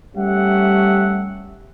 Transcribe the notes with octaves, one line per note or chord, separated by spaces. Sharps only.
G3 A3 C#4 G4 E5 F#5